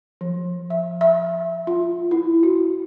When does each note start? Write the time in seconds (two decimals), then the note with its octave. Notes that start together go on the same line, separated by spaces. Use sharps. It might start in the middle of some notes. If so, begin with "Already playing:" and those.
0.21 F3
0.70 E5
1.01 E5
1.67 F4
2.11 E4
2.43 F#4